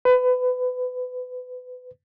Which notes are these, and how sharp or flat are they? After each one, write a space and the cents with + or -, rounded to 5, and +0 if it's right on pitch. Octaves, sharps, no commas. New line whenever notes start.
B4 +25